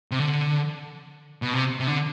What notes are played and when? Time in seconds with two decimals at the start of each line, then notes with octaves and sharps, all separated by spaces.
0.11 C3
0.19 D3
1.42 B2
1.54 C3
1.80 C3
1.87 D3